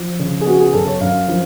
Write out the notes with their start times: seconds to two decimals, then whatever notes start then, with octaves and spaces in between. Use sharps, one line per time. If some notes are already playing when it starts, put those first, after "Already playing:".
Already playing: F3
0.19 C#3
0.41 G#4
0.46 B3 F#4
0.60 G#4
0.73 F#2 A4
0.87 C#5
1.01 F#2 F5
1.28 F3